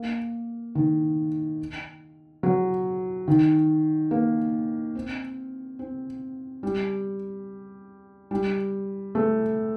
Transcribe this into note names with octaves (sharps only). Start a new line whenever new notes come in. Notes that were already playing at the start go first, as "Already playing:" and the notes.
Already playing: A#3
D#3
F#3
D#3
A#3
C4
C4
G3
G3
A3